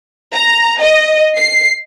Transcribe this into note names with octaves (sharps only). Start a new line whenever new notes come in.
A#5
D#5
C7